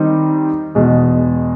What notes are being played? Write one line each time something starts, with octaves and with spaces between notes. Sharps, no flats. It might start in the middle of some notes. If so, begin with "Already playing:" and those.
Already playing: D#3 G3 C4 D#4
E2 B2 G#3